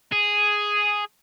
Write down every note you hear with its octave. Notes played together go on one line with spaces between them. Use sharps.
G#4